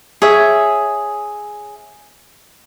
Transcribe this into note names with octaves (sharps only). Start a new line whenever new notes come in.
G#4 C#5 E5